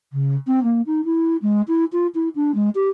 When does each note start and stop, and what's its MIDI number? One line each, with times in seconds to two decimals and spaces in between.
0.12 0.35 49
0.47 0.62 60
0.63 0.81 58
0.86 1.01 63
1.04 1.36 64
1.42 1.61 56
1.68 1.84 64
1.92 2.07 65
2.14 2.28 64
2.35 2.51 62
2.54 2.69 56
2.75 2.89 67